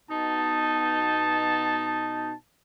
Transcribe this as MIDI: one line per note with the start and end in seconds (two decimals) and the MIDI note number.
0.10 2.34 47
0.10 2.34 63
0.10 2.34 81